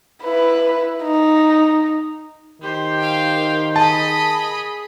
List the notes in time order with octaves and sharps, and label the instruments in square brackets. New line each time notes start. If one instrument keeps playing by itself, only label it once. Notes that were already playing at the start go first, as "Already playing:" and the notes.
[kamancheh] E4 B4
D#4
[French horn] D#3 [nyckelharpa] G4 C5
[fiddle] F5 G5
[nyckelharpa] G#4 [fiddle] D#5 B5 [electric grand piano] A5